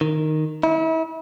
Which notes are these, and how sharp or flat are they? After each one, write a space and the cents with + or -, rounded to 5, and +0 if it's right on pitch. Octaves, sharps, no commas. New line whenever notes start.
D#3 -5
E4 -35